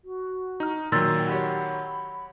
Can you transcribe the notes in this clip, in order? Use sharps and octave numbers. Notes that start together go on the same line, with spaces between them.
F#4
D#4 A#5 F6
A#2 D#3 F#3 G5 C6 E6 A6
F#4 G4 C#5 B5